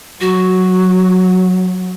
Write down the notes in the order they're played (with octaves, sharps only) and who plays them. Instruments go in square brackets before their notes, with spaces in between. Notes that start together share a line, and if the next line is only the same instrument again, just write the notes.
[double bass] F#3 [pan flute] F#4